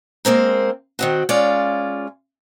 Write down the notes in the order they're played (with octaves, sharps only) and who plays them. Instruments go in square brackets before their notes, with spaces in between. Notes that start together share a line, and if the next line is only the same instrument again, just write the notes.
[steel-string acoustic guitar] G#3 A#3 C4 A#4
D#3 C4 F#4
G#3 C#4 F4 D5